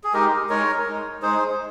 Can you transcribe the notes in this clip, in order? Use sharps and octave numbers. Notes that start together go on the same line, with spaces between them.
G#4
G#3 D#4 G4 A#4
G#3 D#4 A#4 C#5
G#3 D#4
G#3 D#4 G#4 C5